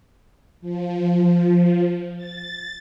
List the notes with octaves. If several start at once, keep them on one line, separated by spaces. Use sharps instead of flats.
F3
A6